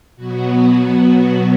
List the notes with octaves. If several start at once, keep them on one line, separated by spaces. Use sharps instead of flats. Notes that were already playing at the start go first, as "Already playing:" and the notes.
B2 F#3 B3 F#4